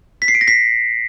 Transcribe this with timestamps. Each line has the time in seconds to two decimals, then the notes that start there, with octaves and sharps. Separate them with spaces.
0.22 B6
0.28 C7
0.35 D7
0.41 A#6
0.48 B6